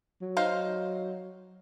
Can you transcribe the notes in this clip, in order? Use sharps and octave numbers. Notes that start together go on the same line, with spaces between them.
F#3
D#4 C5 F5